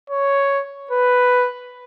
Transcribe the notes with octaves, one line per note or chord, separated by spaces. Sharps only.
C#5
B4